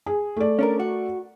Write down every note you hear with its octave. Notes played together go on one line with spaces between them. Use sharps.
G#4
A3 D5
C#4 D4 A#4
F#4